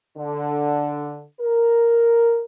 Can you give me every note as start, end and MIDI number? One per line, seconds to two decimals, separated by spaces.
0.17 1.22 50
1.40 2.42 70